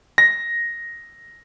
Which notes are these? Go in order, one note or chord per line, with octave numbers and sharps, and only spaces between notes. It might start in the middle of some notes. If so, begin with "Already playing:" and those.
A#6